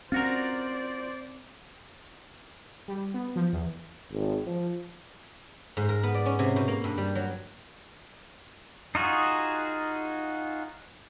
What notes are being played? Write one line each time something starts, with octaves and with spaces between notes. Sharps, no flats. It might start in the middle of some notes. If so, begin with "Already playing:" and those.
C4 C#4 F4 F#4 A#4 C5 D5
G3
B3
F3
E2
G#1
F3
G#2
A#4
B3
D5
C#4
C3
B2
A#3
G2
G3
F#3
D#4 F4 F#4 G#4